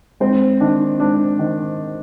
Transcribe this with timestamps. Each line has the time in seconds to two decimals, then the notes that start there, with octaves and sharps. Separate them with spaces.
0.20 G#2 C4
0.60 D#3 D4
1.00 G#2 D4
1.39 D#3